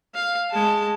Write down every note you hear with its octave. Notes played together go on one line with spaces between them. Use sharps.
F5
G#3 A5